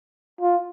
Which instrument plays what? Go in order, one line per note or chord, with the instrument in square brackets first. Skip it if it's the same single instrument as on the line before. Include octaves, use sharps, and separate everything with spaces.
[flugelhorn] F4